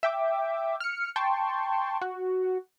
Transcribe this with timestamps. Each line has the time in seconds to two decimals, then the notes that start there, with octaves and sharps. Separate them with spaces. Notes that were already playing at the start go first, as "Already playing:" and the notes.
0.03 E5 G5 D6
0.80 F6 C#7
1.16 G5 A5 C6 C#6
2.01 F#4